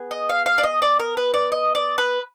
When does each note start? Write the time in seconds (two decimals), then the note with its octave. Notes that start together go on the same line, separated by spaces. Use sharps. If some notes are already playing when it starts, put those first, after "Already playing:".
Already playing: B3 G#4
0.11 D#5
0.29 F5
0.46 F5
0.58 D5
0.63 D#5
0.82 D5
1.00 A#4
1.17 B4
1.34 D5
1.52 D#5
1.75 D5
1.98 B4